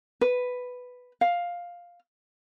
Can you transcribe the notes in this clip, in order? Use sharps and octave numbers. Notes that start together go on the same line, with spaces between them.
B4
F5